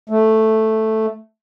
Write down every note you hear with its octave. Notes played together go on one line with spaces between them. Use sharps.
A3